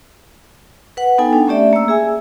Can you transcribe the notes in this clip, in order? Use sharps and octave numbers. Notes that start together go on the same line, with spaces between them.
B4 F#5
B3 D#4 A4 G5 G#5
D4
A3 C#4 G4 D5 E5
A#3 E6
G#4 E5 G#5